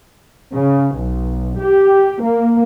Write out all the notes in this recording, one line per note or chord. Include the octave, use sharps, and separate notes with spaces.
C#3
B1
G4
A#3